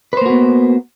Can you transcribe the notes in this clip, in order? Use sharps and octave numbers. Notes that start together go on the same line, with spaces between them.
A#3 B3 F#4 B4 C5